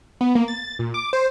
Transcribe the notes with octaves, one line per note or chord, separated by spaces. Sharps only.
B3
A#3
A6
A#2
D6
C5